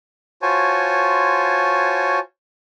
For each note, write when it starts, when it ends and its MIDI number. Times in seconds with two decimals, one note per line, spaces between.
0.42 2.19 65
0.42 2.19 66
0.42 2.19 72
0.42 2.19 73
0.42 2.19 80
0.42 2.19 81